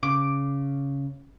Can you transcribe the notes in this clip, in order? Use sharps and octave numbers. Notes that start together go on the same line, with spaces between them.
C#3 D6